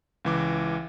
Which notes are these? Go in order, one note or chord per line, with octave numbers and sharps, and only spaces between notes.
C#2 E3 D6